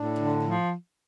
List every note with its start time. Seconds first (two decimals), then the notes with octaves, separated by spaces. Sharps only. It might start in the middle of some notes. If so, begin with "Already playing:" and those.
Already playing: A2 D4
0.19 D3
0.44 F3